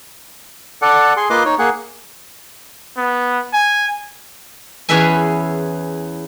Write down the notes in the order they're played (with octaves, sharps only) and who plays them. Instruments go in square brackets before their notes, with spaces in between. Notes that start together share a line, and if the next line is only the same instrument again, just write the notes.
[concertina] A4 D5 F#5
G#4 C6
A#3 F4 B4 D#5 C6 D6
D#4 C#5
A#3 G#4 F#5
[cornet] B3
G#5
[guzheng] E2 C#4 G#4 B4 E5 G#5